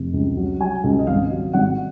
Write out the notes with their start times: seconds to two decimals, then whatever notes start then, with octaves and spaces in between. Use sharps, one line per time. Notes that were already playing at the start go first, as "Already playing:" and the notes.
Already playing: F1
0.14 C#2
0.37 F#3
0.60 F#3 G#5
0.84 C#2
0.99 D#5
1.07 G#1 F5
1.31 F#3
1.53 G#1 F#5